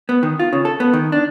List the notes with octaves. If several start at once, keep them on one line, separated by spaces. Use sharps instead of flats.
B3
D#3
F4
C#3
A4
B3
D#3
D4